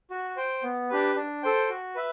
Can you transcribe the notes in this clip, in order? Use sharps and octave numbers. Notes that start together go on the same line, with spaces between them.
F#4
C5 G5
B3
D4 G4 B4
D4
A4 C5 G5
F#4
B4 E5